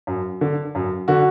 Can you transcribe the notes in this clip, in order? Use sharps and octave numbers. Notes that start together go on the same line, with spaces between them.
F#2
D3
F#2
D3 F#4